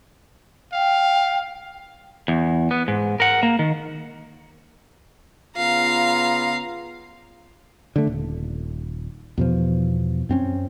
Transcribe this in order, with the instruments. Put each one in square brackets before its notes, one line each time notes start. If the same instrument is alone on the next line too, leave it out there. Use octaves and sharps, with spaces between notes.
[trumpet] F5 [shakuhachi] G5
[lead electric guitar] E2
B3
G#2
A#4 F#5
A#3
D#3
[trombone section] C#3 B3 F4 [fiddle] F5 A#5
[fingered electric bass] D3 A3
D#1
E2 B2 F3
F#2 C4 C#4